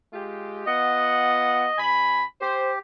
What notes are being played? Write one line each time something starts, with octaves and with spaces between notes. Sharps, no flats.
G#3 F4 G4
B3 F4 D#5 F#5
G2 G#5 B5
G4 C5